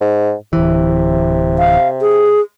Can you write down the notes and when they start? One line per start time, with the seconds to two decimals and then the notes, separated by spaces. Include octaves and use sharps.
0.01 G#2
0.53 D1 C3 E3
1.58 F5
2.01 G#4